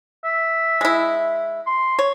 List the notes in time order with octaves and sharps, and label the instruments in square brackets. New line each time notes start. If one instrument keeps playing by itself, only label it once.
[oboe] E5
[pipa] G#3 E4
[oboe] C6
[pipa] C#5